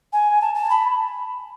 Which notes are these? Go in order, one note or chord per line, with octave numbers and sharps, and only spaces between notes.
G#5
A5
A5
B5